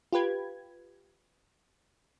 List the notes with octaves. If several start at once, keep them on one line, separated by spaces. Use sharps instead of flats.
F4 G4 B4 G#6